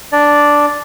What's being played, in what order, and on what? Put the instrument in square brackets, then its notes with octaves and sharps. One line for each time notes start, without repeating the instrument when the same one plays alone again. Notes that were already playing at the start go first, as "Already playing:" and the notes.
[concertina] D4 D5